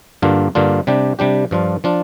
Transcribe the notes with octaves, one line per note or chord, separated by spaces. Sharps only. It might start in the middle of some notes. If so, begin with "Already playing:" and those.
G2 D3 A#3 D4 F4
G2 D3 A#3 D4 F4
C3 G3 D4 G4
C3 G3 D4 G4
G2 F3 D4 F4
F3 D4 F4